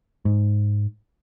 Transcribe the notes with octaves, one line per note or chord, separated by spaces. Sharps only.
G#2